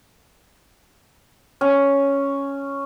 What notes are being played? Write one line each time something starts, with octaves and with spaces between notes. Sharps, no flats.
C#4